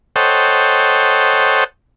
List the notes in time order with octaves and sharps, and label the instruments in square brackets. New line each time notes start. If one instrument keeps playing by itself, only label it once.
[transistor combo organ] A4 C5 C#5 D#5 F#5 G5